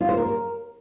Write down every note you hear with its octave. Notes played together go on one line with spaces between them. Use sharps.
F4
C5
A#4